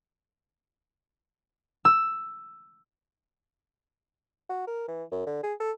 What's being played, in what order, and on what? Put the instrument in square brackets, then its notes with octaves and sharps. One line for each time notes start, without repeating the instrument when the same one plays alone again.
[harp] E6
[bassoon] F#4
A#4
E3
F#2
D3
G#4
A4